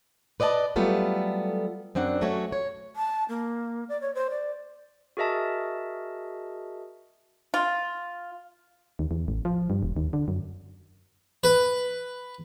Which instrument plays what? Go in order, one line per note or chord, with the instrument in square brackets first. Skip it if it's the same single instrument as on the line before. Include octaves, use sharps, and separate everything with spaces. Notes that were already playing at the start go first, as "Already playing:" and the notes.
[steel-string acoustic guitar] B4 D5 D#5 F#5 A5
F#3 G3 A3 B3 F4 A4
F#2 C4 D4 F#5
F#3 A3 C#4 F#4 C#5
C#5
[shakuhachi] A5
A#3
D5
C#5
C5
D5
[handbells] F#4 G#4 A#4 D#5 E5 A5
[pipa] F4
[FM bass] D#2
E2
A1
F3
G2
E1
D#2
D3
F#2
[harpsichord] B4